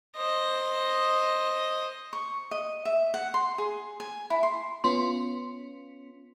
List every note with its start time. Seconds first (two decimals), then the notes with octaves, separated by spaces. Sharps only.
0.17 C5 D#5
2.13 C#6
2.51 D#5
2.85 E5
3.14 F#5
3.34 C6
3.58 G#4
4.00 G#5
4.30 E4
4.43 C6
4.84 B3 C#4 F4 C6